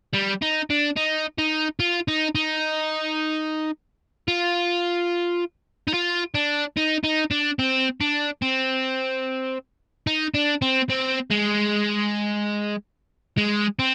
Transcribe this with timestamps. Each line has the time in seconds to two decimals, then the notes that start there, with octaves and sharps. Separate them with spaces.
0.14 G3
0.42 D#4
0.70 D4
0.97 D#4
1.38 D#4
1.80 F4
2.08 D#4
2.35 D#4
4.28 F4
5.87 D#4
5.93 F4
6.34 D4
6.77 D#4
7.04 D#4
7.31 D4
7.59 C4
8.01 D4
8.42 C4
10.07 D#4
10.34 D4
10.62 C4
10.90 C4
11.30 G#3
13.38 G#3
13.79 C4